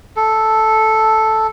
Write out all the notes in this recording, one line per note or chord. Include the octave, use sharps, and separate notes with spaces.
A4